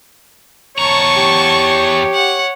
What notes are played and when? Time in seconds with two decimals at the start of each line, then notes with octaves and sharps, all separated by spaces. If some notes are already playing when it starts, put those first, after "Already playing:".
0.79 E2 C#5 A5 A#5 C#6
1.17 G4
2.14 F#5